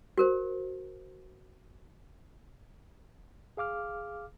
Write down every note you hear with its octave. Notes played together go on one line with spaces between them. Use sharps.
F#4 A#4 C5
G#4 F5 D6 F6